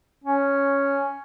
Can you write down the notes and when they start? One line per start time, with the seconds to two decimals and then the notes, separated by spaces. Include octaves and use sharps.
0.24 C#4